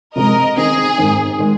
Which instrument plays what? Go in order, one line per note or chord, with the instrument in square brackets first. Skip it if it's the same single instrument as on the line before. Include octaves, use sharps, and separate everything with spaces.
[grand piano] C3 F3 G#3 C4 [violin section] A#4 D#5
[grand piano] D#3 C4 D#4 [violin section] G#4
[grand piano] G#2 D#3 C4 D#4
D#3 G#3